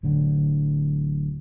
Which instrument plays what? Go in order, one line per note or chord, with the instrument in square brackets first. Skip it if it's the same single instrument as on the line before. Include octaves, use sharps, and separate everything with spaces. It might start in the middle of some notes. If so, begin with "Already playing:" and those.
[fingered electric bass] D1 D2 D3